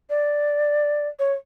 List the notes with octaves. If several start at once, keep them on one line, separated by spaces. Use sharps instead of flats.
D5
C#5